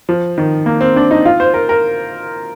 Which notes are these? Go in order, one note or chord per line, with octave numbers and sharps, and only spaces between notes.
F3
D#3
A#3
C4
D4
D#4
F4
C5
A#4
A#4